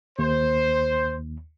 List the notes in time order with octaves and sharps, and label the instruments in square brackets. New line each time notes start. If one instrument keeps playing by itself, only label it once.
[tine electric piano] D#2 [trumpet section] C5